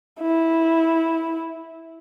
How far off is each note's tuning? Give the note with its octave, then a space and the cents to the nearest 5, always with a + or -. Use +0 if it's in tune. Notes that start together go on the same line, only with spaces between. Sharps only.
E4 -10